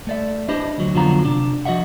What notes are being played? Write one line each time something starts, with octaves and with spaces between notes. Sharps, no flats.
A3 D5 E5
D4 E4 G4 B4 C5 D#5
D2 F#3
F2 D3 F#3 B3 F4 A#5
C3 D4
F3 F#4 D#5 E5 F#5